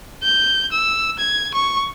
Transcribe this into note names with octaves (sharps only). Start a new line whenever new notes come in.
G6
E6
G#6
C#6